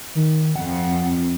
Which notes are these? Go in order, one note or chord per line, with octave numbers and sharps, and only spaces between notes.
D#3
F2 F#5